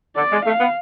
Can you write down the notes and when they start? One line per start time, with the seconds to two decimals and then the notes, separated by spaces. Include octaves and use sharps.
0.16 D3 D5
0.32 G#3
0.46 A3 F5
0.60 B3